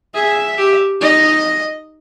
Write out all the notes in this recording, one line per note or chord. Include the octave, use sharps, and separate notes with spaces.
G#4 E5
G4
D#4 D#5